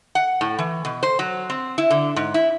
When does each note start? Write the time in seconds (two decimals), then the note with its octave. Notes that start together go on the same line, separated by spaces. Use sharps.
0.15 F#5
0.41 A2
0.59 E3
0.85 B2
1.03 C5
1.19 F#3
1.50 C4
1.78 E4
1.90 D3
2.16 G#2
2.34 E4